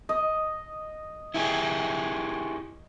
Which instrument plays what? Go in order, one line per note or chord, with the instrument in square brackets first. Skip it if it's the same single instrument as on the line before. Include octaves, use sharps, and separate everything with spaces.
[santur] D#5
[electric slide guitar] E4 G4 G#4